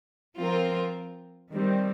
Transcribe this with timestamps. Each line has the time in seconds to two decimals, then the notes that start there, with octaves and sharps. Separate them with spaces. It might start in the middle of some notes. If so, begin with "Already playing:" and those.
0.37 F3 C4 F4 A#4
1.50 D#3 G3 C4